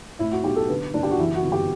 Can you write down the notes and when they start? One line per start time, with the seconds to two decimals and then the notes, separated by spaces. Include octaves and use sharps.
0.19 A2 E4
0.32 F#4
0.44 B1 G4
0.56 A4
0.69 D3 B4
0.94 F#1 D4
1.03 G4
1.11 F#4
1.19 E3 E4
1.35 F#4
1.44 G1
1.52 G4